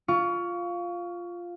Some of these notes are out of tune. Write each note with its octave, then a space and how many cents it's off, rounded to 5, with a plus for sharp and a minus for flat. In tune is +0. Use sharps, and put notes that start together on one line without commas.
F4 +0 C#6 +25